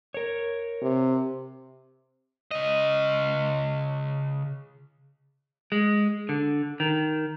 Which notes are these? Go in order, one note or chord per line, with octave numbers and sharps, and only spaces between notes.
A#4 C#5
C3
C#3 D#5
G#3
D3
D#3